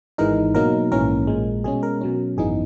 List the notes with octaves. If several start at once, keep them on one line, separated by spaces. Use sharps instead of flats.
G#1 G#2 E3 G#3 D#4 A#4
B2 F#3 A#3 D#4 A#4
A#1 G#2 E3 A#3 C#4 A#4
A#1 A#2 G#3
B2 G#3 C#4 G#4
A#4
B2 F#3 C#4
G#1 F#2 E3 B3 D#4 G#4